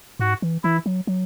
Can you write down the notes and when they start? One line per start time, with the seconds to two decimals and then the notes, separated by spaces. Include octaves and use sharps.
0.20 G#2 F#4
0.42 E3
0.64 E3 E4
0.86 F#3
1.07 F#3